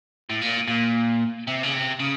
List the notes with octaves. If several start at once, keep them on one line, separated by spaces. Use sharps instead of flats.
A2
A#2
A#2
C3
C#3
C3
C#3